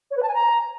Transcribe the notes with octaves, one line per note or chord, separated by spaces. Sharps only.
C#5
B4
A5
G#5
A#5